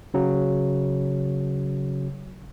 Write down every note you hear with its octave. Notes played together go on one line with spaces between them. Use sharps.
C#3 F#3